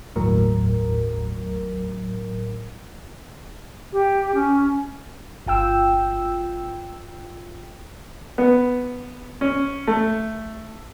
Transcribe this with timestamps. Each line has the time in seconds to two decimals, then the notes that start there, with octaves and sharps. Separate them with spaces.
0.16 G1 D#2 A2 F#3 A#4
3.92 G4
4.34 C#4
5.46 G1 F4 G5 E6
8.38 B3
9.41 C#4
9.87 A3